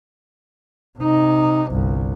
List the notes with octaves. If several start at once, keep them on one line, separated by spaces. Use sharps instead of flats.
C3 D#4
G1 C2